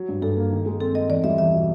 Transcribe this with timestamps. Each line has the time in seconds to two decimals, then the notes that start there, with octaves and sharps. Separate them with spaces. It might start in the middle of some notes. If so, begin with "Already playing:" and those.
Already playing: F#3
0.09 G2
0.22 G2 A4
0.37 A#3
0.52 D#3
0.66 G#3
0.81 C4 A4
0.95 C4 D#5
1.10 E2 D5
1.24 G3 E5
1.38 E2 E5
1.53 B2